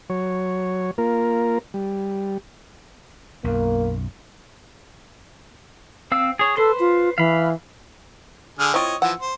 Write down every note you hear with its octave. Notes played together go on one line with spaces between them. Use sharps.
F#3 C#5
A#3 F4 A#4
G3
B1 F#2 A#3
C4 F5 E6
G#4 C#5
A4 B4 C5 C6
F4
E3 F5 B5
D3 G#4 F6
C4 E4 F4 C#5 D#5
E3 F3 F#5 E6
C5